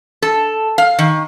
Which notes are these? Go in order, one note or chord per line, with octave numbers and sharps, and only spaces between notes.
A4
F5
D#3